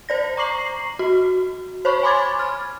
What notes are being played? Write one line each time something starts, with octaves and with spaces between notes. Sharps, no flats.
C5 D5 A#6
A#5 C#6 D6 C7 F#7
F#4
C5 C#5 B5 C#6
G#5 B5 C6 D6 G#6 A6
F6